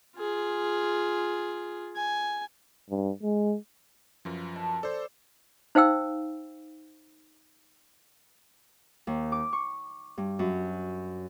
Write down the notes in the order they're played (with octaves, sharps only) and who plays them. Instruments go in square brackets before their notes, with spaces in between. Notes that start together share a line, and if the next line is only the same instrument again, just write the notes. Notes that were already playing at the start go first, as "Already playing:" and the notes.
[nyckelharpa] F4 G#4
G#5
[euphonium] G2
G#3
[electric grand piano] F#2 F3 [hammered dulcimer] B4
[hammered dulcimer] A5
[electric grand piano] A4 C5 [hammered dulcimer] D5
[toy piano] D#4 C5 F5 G5 E6
[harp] D#2
D6
C#6
G2
F#2